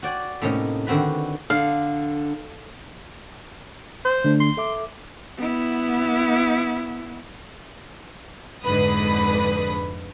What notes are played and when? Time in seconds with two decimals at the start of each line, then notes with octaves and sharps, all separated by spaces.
0.02 F#4 D5 G5 G#5
0.42 A2 C3 A#3 C#4 D#4 D#5
0.87 D3 D#3 C4 F#4 B4
1.50 D3 F5
4.05 C5
4.24 D3 A3 D4
4.40 C6
4.57 A4 E5 D6
5.37 B3 E4
8.63 F2 G#2 D3 B4 B5 D#6